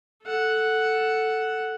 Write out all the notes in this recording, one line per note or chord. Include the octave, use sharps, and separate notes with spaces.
A4 F#5